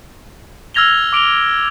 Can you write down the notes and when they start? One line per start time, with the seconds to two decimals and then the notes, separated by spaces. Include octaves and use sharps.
0.74 E6 F6 G#6 A#6 F7 G7
1.13 D6 D7 F7 G7